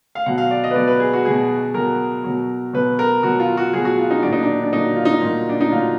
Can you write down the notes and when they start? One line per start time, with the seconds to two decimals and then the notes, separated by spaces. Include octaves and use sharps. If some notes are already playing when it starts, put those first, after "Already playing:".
0.15 F5
0.26 B2 F#3 F#5
0.38 F5
0.51 D5
0.64 D#5
0.71 B4
0.76 B2 F#3 D5
0.88 B4
1.00 G#4
1.13 F#4
1.25 B2 F#3 G#4
1.74 B2 F#3 A#4
2.24 B2 F#3
2.73 B2 F#3 B4
2.99 A#4
3.23 B2 F#3 F#4
3.40 F4
3.57 F#4
3.73 B2 F#3 G#4
3.85 F#4
3.99 F4
4.10 D#4
4.23 A#2 F#3 D4
4.33 D#4
4.43 D4
4.63 D4
4.72 A#2 F#3 D#4
4.96 F4
5.05 D#4
5.22 A#2
5.27 F#3
5.49 D4
5.61 D#4
5.72 A#2 F#3 F4